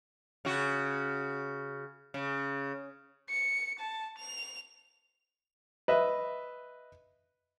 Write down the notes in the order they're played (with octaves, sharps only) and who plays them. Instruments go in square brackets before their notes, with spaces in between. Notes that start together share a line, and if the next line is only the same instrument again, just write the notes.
[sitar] C#3 F#4
C#3
[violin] C#7
A5
F7
[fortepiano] B4 D#5 E5